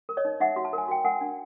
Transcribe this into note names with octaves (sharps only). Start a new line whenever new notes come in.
A#4
C#5 D#5
D#4
D#4 E5 F#5
F#4
A5
A#4
G#5
F#4 G5
A#4 F#5 G#5
D4